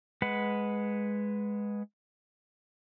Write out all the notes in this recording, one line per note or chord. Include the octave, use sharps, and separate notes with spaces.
G#3 B4 F#5